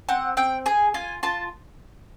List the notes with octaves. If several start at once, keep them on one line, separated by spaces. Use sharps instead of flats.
C4 F#5
C4 G5
G#4 G#5
F4 G#5
F4 A5